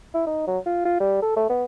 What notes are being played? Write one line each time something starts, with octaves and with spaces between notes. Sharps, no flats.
E4
D#4
F#3
F4
F4
G3
A4
A3
B3